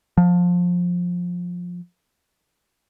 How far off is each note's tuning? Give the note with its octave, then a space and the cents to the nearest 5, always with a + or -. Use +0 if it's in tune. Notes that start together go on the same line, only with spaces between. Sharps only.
F3 +20